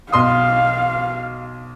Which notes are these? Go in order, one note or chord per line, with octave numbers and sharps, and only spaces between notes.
B1 F5 C6 D#6